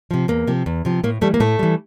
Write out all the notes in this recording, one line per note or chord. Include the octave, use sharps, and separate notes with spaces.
C3 F3
E2 A#3
C3 F3
E2
C3 F3
A2 A#3
E3 G3 A3
A#3
A2 A3
E3 G3